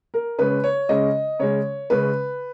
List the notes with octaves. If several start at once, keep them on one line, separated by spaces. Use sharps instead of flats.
A#4
C#3 G#3 C#4 B4
C#5
C#3 G#3 C#4 D#5
C#3 G#3 C#4 C#5
C#3 G#3 C#4 B4